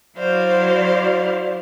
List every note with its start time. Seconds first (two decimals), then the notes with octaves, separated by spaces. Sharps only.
0.18 F#3 E4 F#4 C5 D5 F5